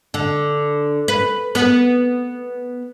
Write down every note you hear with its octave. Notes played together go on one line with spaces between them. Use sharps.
D3
B4
B3